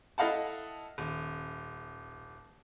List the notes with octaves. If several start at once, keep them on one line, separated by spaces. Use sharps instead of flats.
E4 A4 D#5 F5 F#5 A5
D#1